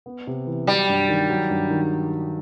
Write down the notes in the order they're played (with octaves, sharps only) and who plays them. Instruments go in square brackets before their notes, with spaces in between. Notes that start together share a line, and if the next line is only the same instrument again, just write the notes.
[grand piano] B3
C3
E3
[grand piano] F#3 [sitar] G3
[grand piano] G2
D#3
F#3
G2
D#3